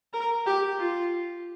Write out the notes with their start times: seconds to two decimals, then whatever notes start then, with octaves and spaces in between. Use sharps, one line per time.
0.13 A#4
0.46 G4
0.79 F4